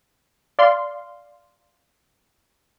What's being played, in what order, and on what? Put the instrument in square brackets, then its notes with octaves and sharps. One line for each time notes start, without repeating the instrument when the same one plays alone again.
[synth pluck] D5 F5 C6